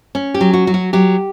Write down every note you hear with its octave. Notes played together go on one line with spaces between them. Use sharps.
C#4
G4
F#3
F#4
F#3
F#4
F#3 G4